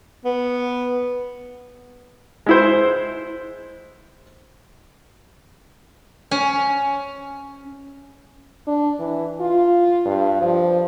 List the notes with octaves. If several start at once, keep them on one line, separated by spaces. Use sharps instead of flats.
B3
G#3 E4 C5
C#4
D4
E3
F4
G2
F3